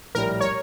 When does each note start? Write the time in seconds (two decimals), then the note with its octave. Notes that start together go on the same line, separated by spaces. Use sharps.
0.15 A#1 A2 G3 A#4
0.41 C#5